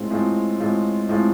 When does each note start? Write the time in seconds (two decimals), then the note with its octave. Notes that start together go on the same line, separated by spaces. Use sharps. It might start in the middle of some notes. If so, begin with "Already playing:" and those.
Already playing: A2 G#3 C4 F4
0.10 A2 G#3 C4 F4
0.60 A2 G#3 C4 F4
1.09 A2 G#3 C4 F4